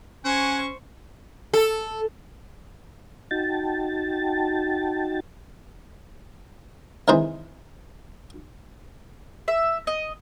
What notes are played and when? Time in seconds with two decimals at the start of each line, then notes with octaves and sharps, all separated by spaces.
0.25 C#4 C5 F#5 G#5 C#6
1.54 A4
3.31 D#4 F#4 G5 A5 A6
7.08 C3 D#3 E3 G#4 C5
9.48 E5
9.87 D#5